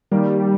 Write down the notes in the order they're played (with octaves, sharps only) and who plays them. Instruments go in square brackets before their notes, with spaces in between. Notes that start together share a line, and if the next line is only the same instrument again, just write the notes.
[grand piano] D#3 A#3 [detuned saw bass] G3